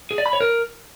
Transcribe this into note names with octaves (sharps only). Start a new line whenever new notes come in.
G#4
D5
B5
C#5
A#4